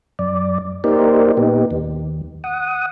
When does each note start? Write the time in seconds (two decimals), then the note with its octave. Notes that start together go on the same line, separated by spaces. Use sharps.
0.19 F#2 D5
0.84 A#3 D#4 G4 A#4 C5 D5
1.37 A#2 B3 D#4 G4
1.71 D#2
2.44 F#5 D#6